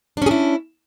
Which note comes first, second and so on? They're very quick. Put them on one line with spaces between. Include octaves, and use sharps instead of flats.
D4 C#4 G#4 E4